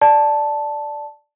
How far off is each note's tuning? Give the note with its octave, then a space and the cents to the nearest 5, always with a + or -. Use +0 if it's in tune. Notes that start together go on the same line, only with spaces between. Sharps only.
D5 +0 A5 +0